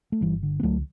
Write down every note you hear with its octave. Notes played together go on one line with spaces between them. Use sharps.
A3
G1 E3 G3
D3
B3
C#2 F#3 A3